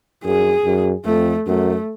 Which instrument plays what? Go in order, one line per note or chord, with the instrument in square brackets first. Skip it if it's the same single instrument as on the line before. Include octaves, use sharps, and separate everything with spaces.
[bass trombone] F#2 [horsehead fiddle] G#4
[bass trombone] F#2
[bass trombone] F2 [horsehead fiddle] A3
[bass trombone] F#2 [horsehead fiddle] A3